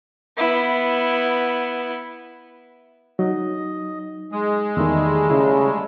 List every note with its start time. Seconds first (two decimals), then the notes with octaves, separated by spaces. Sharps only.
0.37 B3 E4
3.19 F#3 D#4 D#5
4.32 G#3 D#6
4.77 E2 D#3 G3 A3 E6
5.30 C#3 E4